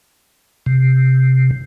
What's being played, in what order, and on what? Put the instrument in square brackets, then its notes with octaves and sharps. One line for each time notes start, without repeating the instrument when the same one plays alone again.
[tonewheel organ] C3